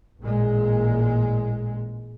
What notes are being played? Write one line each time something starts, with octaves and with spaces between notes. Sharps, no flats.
A1 A#2 G#3